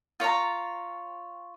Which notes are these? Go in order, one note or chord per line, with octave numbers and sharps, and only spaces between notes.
F4 C#5 A5 A#5